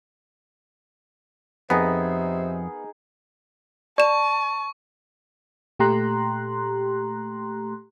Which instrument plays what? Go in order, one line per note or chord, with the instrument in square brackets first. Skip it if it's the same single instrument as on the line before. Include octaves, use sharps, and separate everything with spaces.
[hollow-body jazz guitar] F2 [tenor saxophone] C3 [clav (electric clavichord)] B3 [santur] D#4 G#4 A#4
[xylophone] D5 E7 [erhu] A5 [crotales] C#6
[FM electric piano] A#2 A3 G4 A#5 C6 F#6